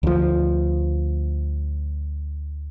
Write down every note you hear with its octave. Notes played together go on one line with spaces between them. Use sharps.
D2 F3